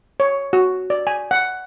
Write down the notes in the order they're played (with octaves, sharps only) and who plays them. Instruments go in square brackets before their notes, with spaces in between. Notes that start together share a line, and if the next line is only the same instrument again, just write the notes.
[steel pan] C#5
F#4
D5
G#5
F#5